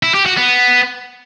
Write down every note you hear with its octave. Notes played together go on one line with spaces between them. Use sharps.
E4
G4
F#4
B3